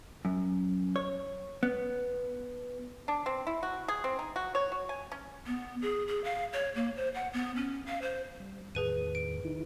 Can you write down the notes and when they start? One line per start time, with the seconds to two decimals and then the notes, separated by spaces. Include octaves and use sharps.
0.25 F#2
0.96 C#5
1.63 B3
3.08 D4
3.26 C4
3.47 E4
3.63 F#4
3.88 G#4
4.04 C4
4.19 D#4
4.36 F#4
4.55 C#5
4.72 F#4
4.89 G#5
5.12 C#4
5.47 B3
5.82 G#4
6.08 G#4
6.24 F5
6.53 C#5
6.75 A#3
6.97 C5
7.14 F#5
7.33 B3
7.56 C#4
7.86 F5
8.02 C5
8.40 G3
8.75 E2 A2 D#3 G#4 B4 D#7
9.15 D7
9.45 D#3 D#4 E4